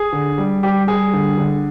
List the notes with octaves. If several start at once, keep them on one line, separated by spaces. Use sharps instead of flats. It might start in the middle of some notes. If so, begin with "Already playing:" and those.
Already playing: G#4
D3
G3
G3 G4
G3 G#4
D3
D3